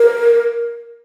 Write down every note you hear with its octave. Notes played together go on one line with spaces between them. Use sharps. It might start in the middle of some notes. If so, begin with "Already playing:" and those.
Already playing: A#4